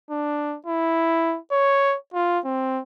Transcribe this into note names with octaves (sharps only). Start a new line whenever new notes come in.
D4
E4
C#5
F4
C4